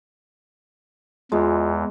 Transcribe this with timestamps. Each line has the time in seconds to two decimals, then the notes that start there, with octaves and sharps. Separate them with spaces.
1.32 E2 G#3 F4